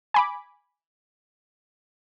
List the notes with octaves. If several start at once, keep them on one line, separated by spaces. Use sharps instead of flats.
G#5 B5 D6